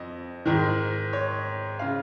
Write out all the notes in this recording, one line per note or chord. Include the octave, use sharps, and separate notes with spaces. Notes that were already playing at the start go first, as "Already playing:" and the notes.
Already playing: F2 D#5
G#2 D#3
C#5
C#3 F5